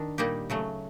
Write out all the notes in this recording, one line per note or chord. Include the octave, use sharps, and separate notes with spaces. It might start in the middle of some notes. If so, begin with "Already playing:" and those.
Already playing: D#3 D4
A#2 G3 A#3 D#4 G4
C#3 F#3 A3